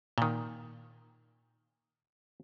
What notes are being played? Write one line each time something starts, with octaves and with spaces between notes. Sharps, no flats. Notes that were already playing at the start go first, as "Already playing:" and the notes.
A#2 D#3